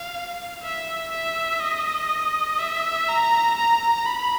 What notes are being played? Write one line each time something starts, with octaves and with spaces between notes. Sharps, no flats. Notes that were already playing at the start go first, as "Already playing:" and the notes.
Already playing: F5
E5
E5
D#5
E5
A#5
A#5
B5